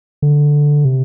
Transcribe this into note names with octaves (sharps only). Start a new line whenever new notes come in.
D3
C3